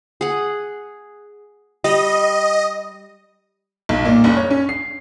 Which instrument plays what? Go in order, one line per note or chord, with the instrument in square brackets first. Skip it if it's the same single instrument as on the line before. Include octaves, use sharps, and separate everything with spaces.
[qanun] G#4 F#5
[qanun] G3 [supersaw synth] D#5
[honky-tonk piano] B1
A#2
F#1
C#5
C#4
C7